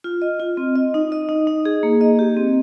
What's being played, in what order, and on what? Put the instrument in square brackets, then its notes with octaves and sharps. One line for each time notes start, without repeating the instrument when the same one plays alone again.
[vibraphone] F4
D#5
F4
C4
D#5
D#4
D#5
D#4
D#4
G#4
A#3
D#5
G4
C4